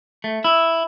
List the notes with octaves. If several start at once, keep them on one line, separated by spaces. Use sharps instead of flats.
A3
E4